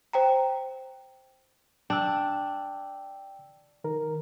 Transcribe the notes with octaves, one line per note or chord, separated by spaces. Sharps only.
C5 G5 A#5
D4 G5 E6
D#3 A#4